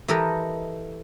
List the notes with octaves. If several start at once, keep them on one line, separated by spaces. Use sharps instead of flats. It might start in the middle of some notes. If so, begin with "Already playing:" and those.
E3 G4 A4 A#4 D#5